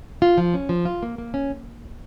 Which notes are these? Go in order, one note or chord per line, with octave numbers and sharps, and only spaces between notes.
F4
F3
C#4
F3
F4
A#3
A#3
C#4